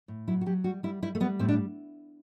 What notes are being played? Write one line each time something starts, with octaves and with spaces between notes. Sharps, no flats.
A2
F#3 E4
F#4
F#3 G4
G3 F#4
G3 E4
G3 E4
A3
G3 B3
A2 C4
D4